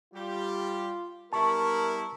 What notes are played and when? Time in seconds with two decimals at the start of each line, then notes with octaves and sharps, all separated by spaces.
0.14 G3 F4 G4
1.33 G3 B3 E4 A#4 A5 C#6